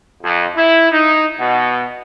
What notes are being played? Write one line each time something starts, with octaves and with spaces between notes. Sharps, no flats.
F2
E4
D#4
B2